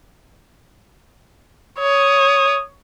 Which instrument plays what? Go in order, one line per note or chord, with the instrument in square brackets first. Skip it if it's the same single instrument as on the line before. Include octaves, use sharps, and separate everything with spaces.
[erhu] C#5 [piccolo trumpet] D#6